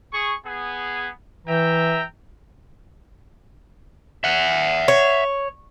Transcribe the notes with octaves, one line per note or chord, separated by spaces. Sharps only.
G#4 C#6
B3 G#4
E3 E5 G5 A#5
E5 F#5
C#5